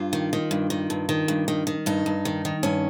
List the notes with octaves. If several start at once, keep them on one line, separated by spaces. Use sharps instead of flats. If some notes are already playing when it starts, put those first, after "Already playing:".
Already playing: G2 F4
D#3
D#3
G2
D#3
G2
D#3
G2
D#3
D#3
G2 D#4
G2
D#3
D#3
G2 C#4